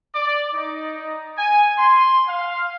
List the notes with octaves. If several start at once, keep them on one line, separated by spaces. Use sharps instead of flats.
D5
D#4
G#5
C6
F5